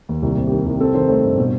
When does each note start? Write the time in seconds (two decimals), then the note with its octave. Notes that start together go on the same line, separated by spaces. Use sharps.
0.09 D#2
0.22 C2 G4
0.37 C3
0.47 D#3 G4
0.66 C2
0.80 C4 A4
0.94 D#3 C5
1.09 A3 C5
1.24 G2
1.38 B2